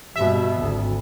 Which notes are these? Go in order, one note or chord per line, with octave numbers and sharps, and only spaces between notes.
G2 B2 E5
G#1 D2